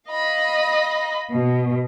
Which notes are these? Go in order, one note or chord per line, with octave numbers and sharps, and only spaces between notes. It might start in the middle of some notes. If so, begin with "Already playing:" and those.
D#5 F5 B5
B2